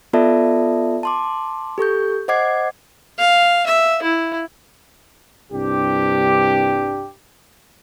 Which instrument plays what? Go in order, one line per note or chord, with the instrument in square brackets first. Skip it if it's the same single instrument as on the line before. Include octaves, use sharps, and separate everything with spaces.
[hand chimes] B3 F4 A4 D5 E5 A5
A5 C6 D6
G4 A4 C#6 G6
C5 D#5 F#5 D6 G#6 C7
[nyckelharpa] F5
E5
E4
[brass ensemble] C2 G2 D4 G4